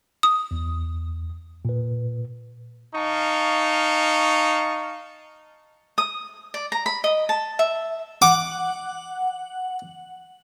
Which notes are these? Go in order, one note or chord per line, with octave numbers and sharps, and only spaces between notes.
D#6
E2
A#2 B4
D#4 F5 A5 C#6
D#6
D5
A#5
B5
D#5
A5
E5
F#5 D6